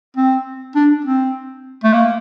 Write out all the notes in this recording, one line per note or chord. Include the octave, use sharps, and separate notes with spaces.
C4
D4
C4
A3
A#3